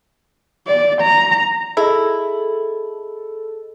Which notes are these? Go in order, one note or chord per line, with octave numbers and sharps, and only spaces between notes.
D5
A#5
E4 G#4 A4 D#5